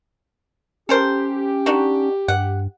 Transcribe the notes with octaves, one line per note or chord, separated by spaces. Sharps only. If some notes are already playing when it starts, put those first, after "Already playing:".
C#4 G4 A4 A#4 C5
D4 D#4 F#4
G2 F#5